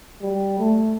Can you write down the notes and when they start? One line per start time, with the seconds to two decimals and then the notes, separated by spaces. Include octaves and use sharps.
0.22 G3
0.60 A3